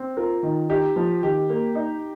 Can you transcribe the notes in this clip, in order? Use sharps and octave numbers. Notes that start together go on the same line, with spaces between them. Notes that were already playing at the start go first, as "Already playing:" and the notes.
Already playing: C4
F4 A#4
D#3
D#4 G4
F3
D#3 G4
A#3
D#4